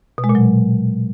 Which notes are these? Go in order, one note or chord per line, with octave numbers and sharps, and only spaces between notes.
B2
G#3
A#2
F#3